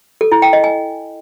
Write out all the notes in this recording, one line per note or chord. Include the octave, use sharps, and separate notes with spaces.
A4
E4
G5
D#5
G#5